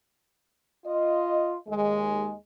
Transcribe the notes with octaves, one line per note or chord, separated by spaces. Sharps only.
F4 D#5
D#2 G#3